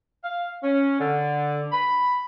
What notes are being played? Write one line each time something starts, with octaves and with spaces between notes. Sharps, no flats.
F5
C#4
D3
B5